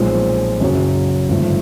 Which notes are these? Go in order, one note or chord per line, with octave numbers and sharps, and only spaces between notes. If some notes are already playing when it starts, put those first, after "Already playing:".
Already playing: B1 A#2 F3 G#3 C4
F#1 F#2 C#3 F#3
G#1 G2 D3 F3 A3